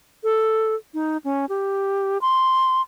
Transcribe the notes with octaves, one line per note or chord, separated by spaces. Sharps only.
A4
D#4
C#4
G4
C6